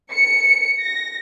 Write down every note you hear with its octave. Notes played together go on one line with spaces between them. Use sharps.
C#7
A#6